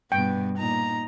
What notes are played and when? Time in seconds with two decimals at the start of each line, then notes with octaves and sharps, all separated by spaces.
0.12 G2 B2 B3 G5
0.58 A#2 D#4 A#5